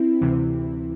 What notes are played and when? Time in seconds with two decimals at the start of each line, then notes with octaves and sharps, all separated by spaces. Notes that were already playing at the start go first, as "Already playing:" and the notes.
Already playing: C4 E4
0.21 D2 C3 E3